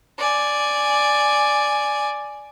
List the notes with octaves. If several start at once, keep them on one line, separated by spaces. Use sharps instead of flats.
D5 G#5